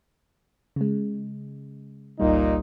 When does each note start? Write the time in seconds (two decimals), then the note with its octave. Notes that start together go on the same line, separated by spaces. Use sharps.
0.76 C#3 G#3
2.20 G1 C#2 A#2 G3 D#4